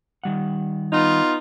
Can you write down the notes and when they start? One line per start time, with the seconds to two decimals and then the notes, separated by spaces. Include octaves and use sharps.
0.24 D#3 G3 F#5
0.92 B3 D#4 F4